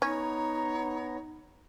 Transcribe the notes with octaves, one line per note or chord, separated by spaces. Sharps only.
B3 C#4 D#4 C#5 A#5